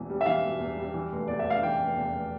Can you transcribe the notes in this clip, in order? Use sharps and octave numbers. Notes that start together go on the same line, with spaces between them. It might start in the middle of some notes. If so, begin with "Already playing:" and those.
Already playing: E1 E2 E3
G3
E5
E3 F5
E1
E2
G3
E3
F1
E2 D5
E5
F1
F5
E3 G5
F1
E2
F1